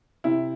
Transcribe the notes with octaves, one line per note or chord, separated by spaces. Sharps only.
C3 E4